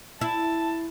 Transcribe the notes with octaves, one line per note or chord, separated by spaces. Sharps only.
E4 A5